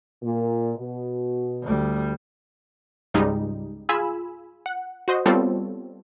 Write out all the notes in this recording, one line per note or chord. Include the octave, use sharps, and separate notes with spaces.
A#2
B2
D2 G3
C#2 G#2 G3 G#3 D#4
F4 G#4 G#5 B5 E6
F#5
F#4 C5 D#5
G3 B3 C4 F4 A4 C#5